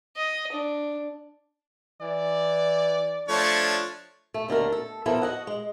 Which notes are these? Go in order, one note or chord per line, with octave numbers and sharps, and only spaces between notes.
D#5
D4
E3 D5
F3 A3 D4 C#5
A3
D#2 D3 A3 A#4
A4
F3 B3 E4 A4 A#4
F#4 D#5 F#5
G#3